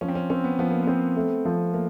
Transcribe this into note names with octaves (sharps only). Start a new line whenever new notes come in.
F3 C#4
C4
C#4
C4 C#4
B3
F3 B3
A#3
B3 C4
A3
F3
A3 A#3